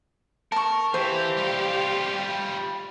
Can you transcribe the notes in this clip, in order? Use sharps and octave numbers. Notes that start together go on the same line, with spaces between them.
A#4 A5 C#6
E3 G4 C5 F5
G3 F4